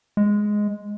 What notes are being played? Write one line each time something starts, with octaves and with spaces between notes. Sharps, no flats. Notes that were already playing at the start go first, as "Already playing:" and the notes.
G#3